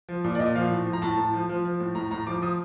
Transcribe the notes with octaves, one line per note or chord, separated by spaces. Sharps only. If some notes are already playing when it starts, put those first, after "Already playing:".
F3
A#2
D5
A#2 D#5
F3 F5
A2
F3
A#5
A2 A5
A2
F3
F3
F3
A2
A2 A#5
A2 A#5
F3 D6
F3 D#6